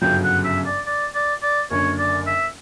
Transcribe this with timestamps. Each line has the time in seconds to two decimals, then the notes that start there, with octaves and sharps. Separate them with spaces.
0.02 G1 F#2 C#3 F#3 G5
0.24 F#5
0.45 E5
0.66 D5
0.87 D5
1.15 D5
1.43 D5
1.71 F#1 F#2 D3 C#5
1.99 D5
2.27 E5